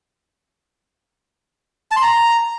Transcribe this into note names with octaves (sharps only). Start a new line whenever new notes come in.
A5
C6
A#5